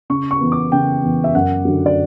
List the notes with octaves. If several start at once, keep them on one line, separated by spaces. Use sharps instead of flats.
C#3 C#6
C#6
E3 B3
D6
C#3 G5
E3 B3
E5
F#2 F#5
D3 F#3
D5